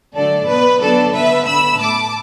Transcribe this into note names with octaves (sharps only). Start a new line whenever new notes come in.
D3 F#3 A3 A4 D5
B2 B3 B4
D3 F#3 B3 A4 D5
D3 B3 B4 E5
D3 B3 B5 E6
A2 A3 A5 D6